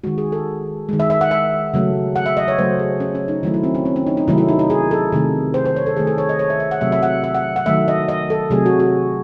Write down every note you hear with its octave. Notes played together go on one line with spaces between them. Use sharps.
D#3 G#3 F#4
G#4
A4
D#3 G#3
E5
E5
F#5
E5
C#3 F#3 A3
F#5
E5
D#5
C#5
C#3 F#3 A3 C5
G#4
C#4
C#4
D#4
D#3 F#3 A3 E4
E4
C4
C#4
C4
C#4
D#4
D#4
C3 D#3 F#3 A3 E4
E4
D#4
D#4
G#4
A4
C3 D#3 A3
C5
C5
C#5
A4
D#3 A3 G#4
A4
C#5
D#5
C#5
E5
E5
F#5
C3 F#3 A3 E5
E5
F#5
E5
F#5
F#5
D#3 F#3 A3 E5
D#5
D#5
A4
C3 F#3 A3 G#4
F#4
F#4